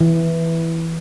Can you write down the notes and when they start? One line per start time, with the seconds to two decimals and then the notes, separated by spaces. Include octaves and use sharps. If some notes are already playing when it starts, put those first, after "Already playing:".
0.01 E3